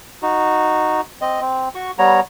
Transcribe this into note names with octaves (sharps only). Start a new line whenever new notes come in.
D#4 F#4
C4 D#5
C4
F#4 C#6
G3 B3 C#5 A#5